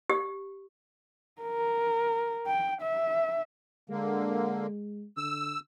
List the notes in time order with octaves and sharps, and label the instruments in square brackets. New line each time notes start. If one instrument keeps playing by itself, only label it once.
[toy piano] G4
[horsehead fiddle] A#4
G5
E5
[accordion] D3 A#3 [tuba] G#3
[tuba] D3 [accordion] E6